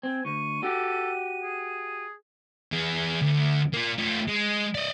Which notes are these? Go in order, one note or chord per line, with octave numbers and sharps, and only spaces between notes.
C4 G#5
D2 C#6 D#7
F#4 G4 A4
G#4
E3 G#4
D2
A#3 F4
A3 F4
G#3
D5 D#5